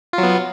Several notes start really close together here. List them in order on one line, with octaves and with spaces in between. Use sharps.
F4 F#3 B3